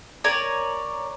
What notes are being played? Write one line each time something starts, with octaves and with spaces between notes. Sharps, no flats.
A#4 C#5 D5 G#5